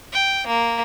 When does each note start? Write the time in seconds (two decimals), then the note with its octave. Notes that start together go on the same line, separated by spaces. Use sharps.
0.12 G5
0.47 A#3